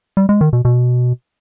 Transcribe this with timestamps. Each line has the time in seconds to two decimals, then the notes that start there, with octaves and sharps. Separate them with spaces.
0.17 G3
0.29 G#3
0.41 D#3
0.53 B2
0.65 B2